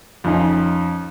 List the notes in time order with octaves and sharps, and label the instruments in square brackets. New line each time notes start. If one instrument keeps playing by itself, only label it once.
[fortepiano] F2 C#4 D#4